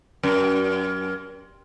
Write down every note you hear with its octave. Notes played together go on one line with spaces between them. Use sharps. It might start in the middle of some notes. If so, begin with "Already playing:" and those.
F#2